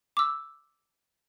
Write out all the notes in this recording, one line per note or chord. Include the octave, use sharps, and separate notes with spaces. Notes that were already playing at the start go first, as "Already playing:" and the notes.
D6 E6